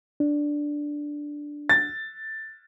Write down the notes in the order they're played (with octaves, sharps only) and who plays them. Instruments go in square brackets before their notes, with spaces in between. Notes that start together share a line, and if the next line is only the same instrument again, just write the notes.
[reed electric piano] D4
[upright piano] A6